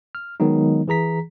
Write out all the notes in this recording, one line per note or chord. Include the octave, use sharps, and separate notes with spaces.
F6
D#3 F#3 G#3 B3 D#4
E3 G#4 A#5 B6